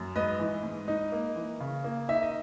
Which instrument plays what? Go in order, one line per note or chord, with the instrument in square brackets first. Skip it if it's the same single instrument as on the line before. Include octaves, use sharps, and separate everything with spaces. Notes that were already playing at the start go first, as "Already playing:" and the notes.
Already playing: [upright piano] F#2
G#2 B4 D#5
E3
G#2
D#4
A#3
E3
C#3
A#3
D#4 E5
D#5